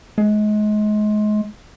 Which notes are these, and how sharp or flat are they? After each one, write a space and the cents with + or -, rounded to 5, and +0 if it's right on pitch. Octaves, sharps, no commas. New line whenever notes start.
G#3 +30